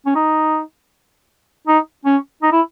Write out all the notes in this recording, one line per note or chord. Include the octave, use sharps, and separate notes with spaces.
C#4
D#4
D#4
C#4
D#4
E4